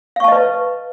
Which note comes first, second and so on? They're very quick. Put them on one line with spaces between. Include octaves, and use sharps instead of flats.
F5 C#6 A5 D#5 B4